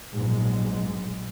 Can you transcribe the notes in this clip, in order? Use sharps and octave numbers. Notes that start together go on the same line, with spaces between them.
A#1 G#2 B2 F#3 G#3